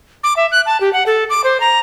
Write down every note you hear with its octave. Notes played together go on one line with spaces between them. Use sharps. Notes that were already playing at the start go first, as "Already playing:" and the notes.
D6
E5
F#6
A5
G4
F#5
A4
D6
C5
A#5